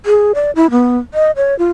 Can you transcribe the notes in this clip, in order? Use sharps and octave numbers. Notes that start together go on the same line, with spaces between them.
G#4
D5
E4
B3
D#5
C#5
F4